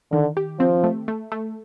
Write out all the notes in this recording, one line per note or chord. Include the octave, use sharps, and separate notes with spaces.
D3 D#3
G4
F3 C4
A3
A3
A3